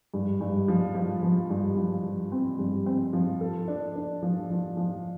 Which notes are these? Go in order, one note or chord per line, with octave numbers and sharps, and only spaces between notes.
G2
G2
F3
F3
F3
G2
F3
F3
C4
G2
C4
F3
A4
D4
D4
F3
F3
F3